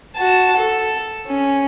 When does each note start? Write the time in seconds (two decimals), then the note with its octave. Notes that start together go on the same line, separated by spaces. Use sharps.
0.16 F#4 A5
0.56 A4
1.27 C#4